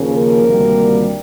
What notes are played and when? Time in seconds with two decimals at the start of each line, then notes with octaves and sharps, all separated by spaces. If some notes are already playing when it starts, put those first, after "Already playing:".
Already playing: D#2 C#3 F3 A#3 C#4
0.12 A#4
0.44 D2 C3 D#3 G3 A#3